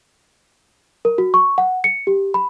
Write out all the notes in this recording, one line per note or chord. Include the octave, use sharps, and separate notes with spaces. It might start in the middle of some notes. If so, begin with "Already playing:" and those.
A#4
F#4
C#6
F#5
C#7
G4
B5